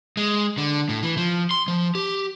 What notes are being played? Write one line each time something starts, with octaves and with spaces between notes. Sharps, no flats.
G#3
D3
A2
E3
F3
C6
F3
G4